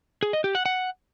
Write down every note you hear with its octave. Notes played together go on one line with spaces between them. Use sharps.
G#4
D#5
G4
F#5
F#5